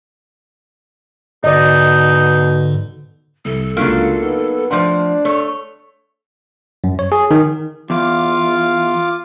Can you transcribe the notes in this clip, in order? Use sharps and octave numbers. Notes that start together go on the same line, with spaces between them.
G#2 B2 D3 D#4 D5 D#5
C2 A4
C#2 F#3 A3 A#3 D4 F4 F#6
B3 D#4
F3 A3 D4 C5 F#5 C6
A3 A4 C#5
F#2
C#5
G#4
D#3
E2 F4 F5 D6